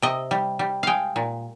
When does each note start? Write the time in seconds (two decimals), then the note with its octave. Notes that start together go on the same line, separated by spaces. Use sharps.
0.02 C3 D#5
0.31 G3
0.59 G3
0.83 G#3 F5 G5
1.16 A#2